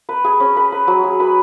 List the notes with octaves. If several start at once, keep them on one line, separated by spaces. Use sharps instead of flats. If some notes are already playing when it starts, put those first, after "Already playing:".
B4
G#4
C#4
B4
B4
F#3
G#4
B4